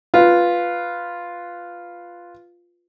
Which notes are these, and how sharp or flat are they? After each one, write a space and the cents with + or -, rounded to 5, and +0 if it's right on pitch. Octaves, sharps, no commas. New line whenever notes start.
F4 +0 B4 +0